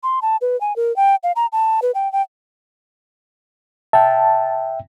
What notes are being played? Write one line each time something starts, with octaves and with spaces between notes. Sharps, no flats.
C6
A5
B4
G#5
A#4
G5
F5
A#5
A5
B4
G5
G5
E5 G5 A5